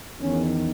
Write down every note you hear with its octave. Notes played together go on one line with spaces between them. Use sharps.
E2 D#3 C#4